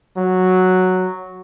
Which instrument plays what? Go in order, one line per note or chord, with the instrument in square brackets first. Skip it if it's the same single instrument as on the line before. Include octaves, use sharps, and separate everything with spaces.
[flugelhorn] F#3